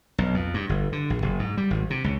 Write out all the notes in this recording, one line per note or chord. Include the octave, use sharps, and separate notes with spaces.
B1
F2
G2
G1
D3
A#1
F#1
G#2
G3
G#1
C3
C#2